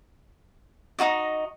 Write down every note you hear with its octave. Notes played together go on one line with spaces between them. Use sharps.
D#4 E4 F#4 D#5